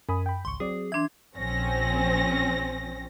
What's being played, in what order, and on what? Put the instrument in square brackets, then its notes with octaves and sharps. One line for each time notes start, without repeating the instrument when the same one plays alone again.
[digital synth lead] F#2 [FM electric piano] G#5 B5 D#6
[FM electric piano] G5 B5
[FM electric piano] G#1 C#2 C#6 [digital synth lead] C6
[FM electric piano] F#3 C4 D5 [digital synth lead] G#4
[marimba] E3 D4 [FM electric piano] E5 C6 [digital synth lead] G#6
[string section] A#1 F3 C4 C#4 A#6